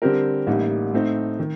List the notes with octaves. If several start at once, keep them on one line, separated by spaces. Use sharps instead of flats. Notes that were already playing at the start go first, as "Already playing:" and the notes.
D3 G3 C4 G4 A#4
A1 A2 G3 A#3 D#4
A2 A3 C4 D#4
D#3